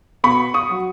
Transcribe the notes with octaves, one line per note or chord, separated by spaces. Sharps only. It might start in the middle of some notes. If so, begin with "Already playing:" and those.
B2 B5 C#6
C#6 D#6
F#3